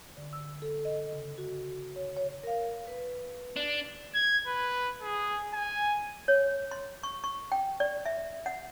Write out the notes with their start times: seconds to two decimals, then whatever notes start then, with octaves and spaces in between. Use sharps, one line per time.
0.17 D3
0.33 E6
0.62 A4
0.85 D#5
1.13 C#3
1.38 F#4
1.96 C#5
2.17 C#5
2.43 A#4 F5
2.87 B4
3.56 D4
4.14 G#6
4.47 B4
5.02 G#4
5.54 G#5
6.28 C#5
6.71 C6
7.03 C#6
7.24 C#6
7.52 G5
7.80 D5
8.06 E5
8.46 F#5